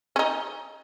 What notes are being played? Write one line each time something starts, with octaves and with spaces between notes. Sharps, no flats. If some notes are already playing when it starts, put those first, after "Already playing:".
C#4
D#4